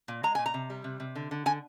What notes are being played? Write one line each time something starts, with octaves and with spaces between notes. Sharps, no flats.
A#2
G#3 A#5
A#2 G#5
A#5
C3
G3
C3
C3
D3
D3
D3 G#5